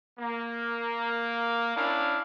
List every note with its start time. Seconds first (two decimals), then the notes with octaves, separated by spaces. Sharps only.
0.18 A#3
1.76 C#4 D4 E4 F5